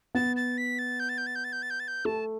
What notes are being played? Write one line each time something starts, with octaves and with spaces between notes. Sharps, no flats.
B3 A6
A6
B6
A6
G6
A6
G6
A6
G6
A6
G6
A6
G6
A6
G6
A3 A5